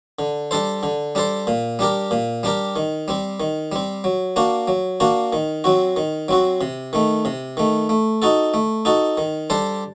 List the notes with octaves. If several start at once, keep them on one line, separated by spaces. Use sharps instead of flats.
D3
G3 D4 A4 C5
D3
G3 D4 A4 C5
A#2
G3 D4 G4 A#4
A#2
G3 D4 G4 A#4
D#3
G3 C4
D#3
G3 C4
F#3
A#3 D4 F#4
F#3
A#3 D4 F#4
D#3
F#3 C4 F#4
D#3
F#3 C4 F#4
C3
D#3 A3
C3
D#3 A3
A3
D#4 F#4 A4
A3
D#4 F#4 A4
D#3
G3 D4 A4 C5